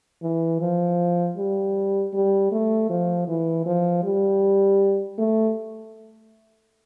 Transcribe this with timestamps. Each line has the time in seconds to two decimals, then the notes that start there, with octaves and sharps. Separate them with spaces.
0.22 E3
0.60 F3
1.37 G3
2.13 G3
2.51 A3
2.89 F3
3.27 E3
3.66 F3
4.03 G3
5.18 A3